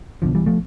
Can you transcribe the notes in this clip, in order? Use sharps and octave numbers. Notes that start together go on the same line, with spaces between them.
B1 B2 D3 F3
E3 G3
F3 A3